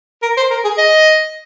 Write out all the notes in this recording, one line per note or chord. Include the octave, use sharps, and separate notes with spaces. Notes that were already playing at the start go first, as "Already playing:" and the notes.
A#4
C5
A#4
G#4
D#5